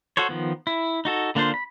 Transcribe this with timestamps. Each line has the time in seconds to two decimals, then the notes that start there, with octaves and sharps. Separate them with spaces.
0.17 F#4 A4 C5 C#5
0.29 D#3 F3 B3
0.67 E4
1.05 D#4 F#4 A4
1.35 D3 A#3 D4 F4 C5
1.54 B5